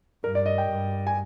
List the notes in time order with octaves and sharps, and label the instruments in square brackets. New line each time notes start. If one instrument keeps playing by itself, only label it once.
[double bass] G2 [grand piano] A#4
[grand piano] D5
D#5
G5
[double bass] G2
[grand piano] G#5